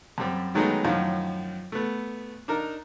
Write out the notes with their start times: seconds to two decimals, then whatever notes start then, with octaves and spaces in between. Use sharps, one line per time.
0.18 F#2 G3 C4
0.55 D#3 F#3 G#3 A3 B3 D#4
0.85 F#2 A2 D#3 F3
1.72 A3 B3
2.48 D4 D#4 A#4